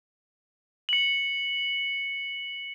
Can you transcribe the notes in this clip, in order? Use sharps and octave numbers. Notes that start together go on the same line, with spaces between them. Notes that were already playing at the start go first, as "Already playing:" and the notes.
C#7 F#7